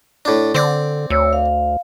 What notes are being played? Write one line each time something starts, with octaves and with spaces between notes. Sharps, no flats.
A2 D4
D3 C4 D5
D2 C#5 E6
F5